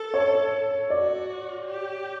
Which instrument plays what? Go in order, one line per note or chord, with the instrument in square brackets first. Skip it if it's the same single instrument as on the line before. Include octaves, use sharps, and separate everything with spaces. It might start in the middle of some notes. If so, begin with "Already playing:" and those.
Already playing: [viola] A4
[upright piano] C#5
[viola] F#4 [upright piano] D5
[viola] G4